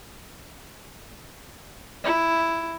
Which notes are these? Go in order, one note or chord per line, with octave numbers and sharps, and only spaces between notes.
E4